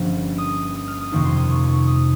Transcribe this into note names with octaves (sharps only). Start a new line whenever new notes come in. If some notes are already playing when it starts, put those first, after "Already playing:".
Already playing: G1 G2 F3 A#3 C#4
D#6
D#6
F6
D#6
F2 C3 D#3 A#3 D#4 C#6
C6
D#6
C#6
C#6
D#6